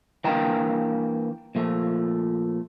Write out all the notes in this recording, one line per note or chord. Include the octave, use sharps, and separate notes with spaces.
E3 A#3 D4 G5 A#5
A#2 F3 A3